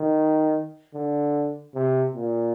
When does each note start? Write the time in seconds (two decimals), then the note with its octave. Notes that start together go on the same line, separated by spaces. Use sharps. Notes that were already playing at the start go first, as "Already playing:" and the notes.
Already playing: D#3
0.95 D3
1.75 C3
2.15 A#2